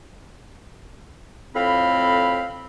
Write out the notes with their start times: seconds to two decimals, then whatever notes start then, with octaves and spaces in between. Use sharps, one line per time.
1.55 F2 A2 C4 F5 B5